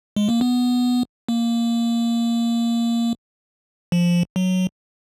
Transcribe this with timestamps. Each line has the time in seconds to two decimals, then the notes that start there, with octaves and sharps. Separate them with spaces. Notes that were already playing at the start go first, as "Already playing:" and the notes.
0.16 G#3
0.29 A#3
0.41 B3
1.29 A#3
3.92 F3
4.36 F#3